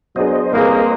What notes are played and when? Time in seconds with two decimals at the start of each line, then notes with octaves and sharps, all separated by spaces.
0.16 F#3 B3 D4 G#4 C5 D#5
0.53 C2 A#3 G#4 B4 F5